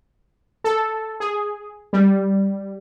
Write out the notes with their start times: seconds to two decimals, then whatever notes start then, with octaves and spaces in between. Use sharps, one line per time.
0.64 A4
1.20 G#4
1.93 G3